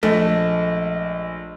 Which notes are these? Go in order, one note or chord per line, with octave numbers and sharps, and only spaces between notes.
A#1 G#3 A3